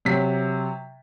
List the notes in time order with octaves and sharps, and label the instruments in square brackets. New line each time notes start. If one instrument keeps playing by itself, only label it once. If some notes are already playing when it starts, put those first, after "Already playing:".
[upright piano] C3 F#3 B6